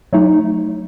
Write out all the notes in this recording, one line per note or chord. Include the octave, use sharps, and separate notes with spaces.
F#3 A3 D#4